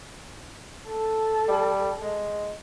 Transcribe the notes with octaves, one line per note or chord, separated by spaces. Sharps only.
A4
G3
G#3